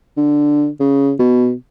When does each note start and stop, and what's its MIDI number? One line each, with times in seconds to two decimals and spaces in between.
0.17 0.68 50
0.80 1.12 49
1.19 1.53 47